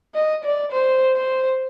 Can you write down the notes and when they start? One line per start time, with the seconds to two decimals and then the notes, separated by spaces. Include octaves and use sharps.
0.15 D#5
0.45 D5
0.72 C5
1.16 C5